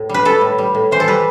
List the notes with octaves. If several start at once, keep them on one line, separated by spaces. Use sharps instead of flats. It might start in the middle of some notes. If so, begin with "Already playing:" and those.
Already playing: A2
G3 B4
G3 A4
A2
G3
A2
E3 C5
A4
G3 B4